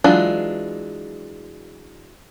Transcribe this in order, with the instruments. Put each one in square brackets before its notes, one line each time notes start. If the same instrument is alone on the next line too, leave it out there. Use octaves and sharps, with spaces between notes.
[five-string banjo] E3 F#3 G#3 D4 F4